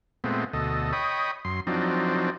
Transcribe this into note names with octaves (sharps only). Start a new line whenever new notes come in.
A#2 G#3 A3 B3 C4
D2 B2 A4 D#5
C#5 D#5 G5 B5 D#6
F#2 C6
F3 F#3 C4 D4 D#4